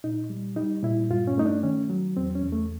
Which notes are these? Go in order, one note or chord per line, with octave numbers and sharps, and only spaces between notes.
A#2 D#4
G3
G3 D#4
A#2 E4
G2 F4
C#4
A3 D#4
D4
D#3 C#4
F#3
E2 C4
C#4
E2
A3